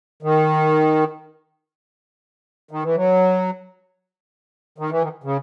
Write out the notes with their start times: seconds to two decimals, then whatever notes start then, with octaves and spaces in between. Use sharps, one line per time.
0.23 D#3
2.71 D#3
2.83 E3
2.96 F#3
4.78 D#3
4.90 E3
5.02 D#3
5.24 C#3